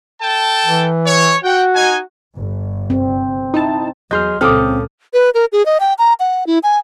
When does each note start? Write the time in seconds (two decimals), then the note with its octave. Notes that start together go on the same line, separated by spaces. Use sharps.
0.21 A4 G5 A5
0.65 E3
1.06 C#5
1.44 F#4 F#5 G5
1.74 D#4 G#5
2.36 G1
2.90 C4
3.54 D#4 E4 A5
4.11 E2 F#3 G#4 D#5 C6 F6 G6
4.41 C#2 A#2 C#3 C4 A4 D6 D#6 F6
5.14 B4
5.34 A#4
5.52 G#4
5.66 D#5
5.80 G5
5.98 A#5
6.20 F#5
6.47 E4
6.63 G#5